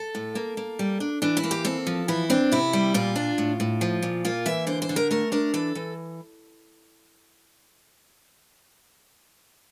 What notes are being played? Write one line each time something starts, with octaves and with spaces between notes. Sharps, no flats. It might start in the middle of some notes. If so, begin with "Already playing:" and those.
Already playing: A4
A2
A#3
A#3
G3
D4
E3 D4
E4
A#3
G4
C4 A4
F3
E3 E4
C4 D4
C3 E4
G3
A#2 F4
D4
A2
A2
F3
A#2
A#3 F4
E3 E5
D3 C5
C5
D3
A#4
A3 A#4
D4 A#4
E3 A4
E3